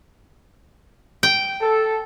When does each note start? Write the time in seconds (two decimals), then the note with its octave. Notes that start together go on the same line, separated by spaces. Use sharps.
1.23 G5
1.61 A4